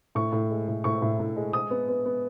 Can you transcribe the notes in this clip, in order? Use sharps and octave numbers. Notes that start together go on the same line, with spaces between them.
A2 C#6
A2
G#3
A2
A2 C#6
A2
A2
G#3
G#3 D#6
B3
B3
B3